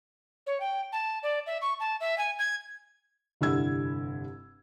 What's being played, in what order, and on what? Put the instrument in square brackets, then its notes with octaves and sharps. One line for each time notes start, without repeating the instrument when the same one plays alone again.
[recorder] C#5
G5
A5
D5
E5
C#6
A5
E5
G#5
G#6
[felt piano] F1 G2 D3 E4 E6 G#6